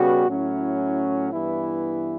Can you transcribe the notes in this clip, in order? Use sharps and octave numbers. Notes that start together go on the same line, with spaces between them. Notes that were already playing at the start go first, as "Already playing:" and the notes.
Already playing: C#3 G3 B3 F#4 B4
A2 F#3 C#4 E4
G2 E3 B3 E4